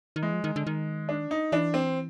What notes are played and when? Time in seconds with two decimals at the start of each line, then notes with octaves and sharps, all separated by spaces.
0.16 D#3
0.23 E3 G#3
0.33 F3
0.44 D#3
0.56 D3
0.67 D#3
1.09 D4
1.31 D#4
1.52 E3 D4
1.74 C4